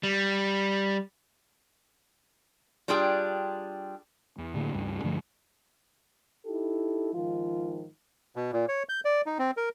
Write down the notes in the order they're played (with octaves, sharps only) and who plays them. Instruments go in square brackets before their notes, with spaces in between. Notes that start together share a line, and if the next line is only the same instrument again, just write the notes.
[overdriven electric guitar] G3
[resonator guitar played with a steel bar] G3 D4 F4 G#4 G5
[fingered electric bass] E2
A2 D3 G3 A#3
C#2 G2
G2 D3 F3 A3
[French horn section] D#4 E4 G4 A4
G#2 D#3 F3 F4
[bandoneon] B2
A#2
C#5
G6
D5
D#4
C4
A#4